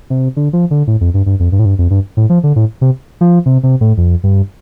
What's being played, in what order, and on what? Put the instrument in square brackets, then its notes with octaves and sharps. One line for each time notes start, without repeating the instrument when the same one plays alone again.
[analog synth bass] C3
D3
F3
D3
A2
F2
G2
G2
F2
G2
A2
G2
F2
G2
A2
F3
D3
A2
C3
F3
C3
C3
A2
F2
G2